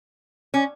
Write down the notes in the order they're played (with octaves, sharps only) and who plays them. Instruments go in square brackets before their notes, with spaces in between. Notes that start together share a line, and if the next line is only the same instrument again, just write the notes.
[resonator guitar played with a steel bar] C#4